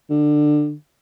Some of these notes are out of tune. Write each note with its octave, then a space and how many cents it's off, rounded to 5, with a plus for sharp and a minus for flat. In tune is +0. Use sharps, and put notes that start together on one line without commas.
D3 +20